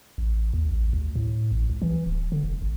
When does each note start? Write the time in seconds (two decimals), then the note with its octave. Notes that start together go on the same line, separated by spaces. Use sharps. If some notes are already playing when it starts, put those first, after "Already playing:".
0.18 A1
0.54 D#2
0.69 A1
0.93 D2
1.15 A2
1.51 A1
1.70 C#2
1.82 E3
2.06 D1
2.32 D3
2.44 F1
2.62 G#1